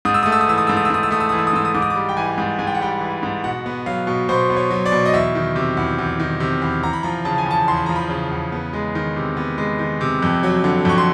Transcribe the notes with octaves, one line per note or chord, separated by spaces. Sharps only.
G#2 D#6
E6
A3 D#6
E6
D#6
E3 E6
D#6
G#2 E6
D#6
E6
G#2 D#6
E6
A3 D#6
E6
E3 D#6
E6
D#6
G#2 E6
D#6
G#2 D6
D#6
D6
G3
G5
E3 G#5
G#2
G#2 G#5
G5
F#5
G3 G5
E3
G#2
B2 F#5
B3
F#3 F5
B2
B2 C5
B3
C#5
F#3
D5
B2
D#5
E2 E5
D#3
C3
E2
E2
D#3
C3
E2
E2 A#5
B5
F3 A#5
C#3 A5
G#5
E2 A5
E2 C6
B5
F3 A#5
B5
C#3
E2
B3
G#3
D#3
C3
B3
G#3
D#3
C3
F2
F#3
D3
F2 C#6
C6